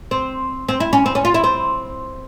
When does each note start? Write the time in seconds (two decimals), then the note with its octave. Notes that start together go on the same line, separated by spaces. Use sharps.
0.11 C4
0.69 C4
0.80 E4
0.93 C#4
1.06 C4
1.15 C#4
1.25 F4
1.34 E4
1.44 C4